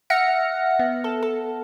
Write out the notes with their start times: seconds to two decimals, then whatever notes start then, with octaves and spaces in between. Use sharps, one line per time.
0.10 E5 F#5 F6 A#6 C#7
0.79 B3
1.04 A4
1.23 A4